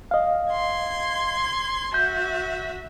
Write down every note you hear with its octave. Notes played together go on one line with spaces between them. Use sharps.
D#5 F5
C6 G#6
F#4 E5 G6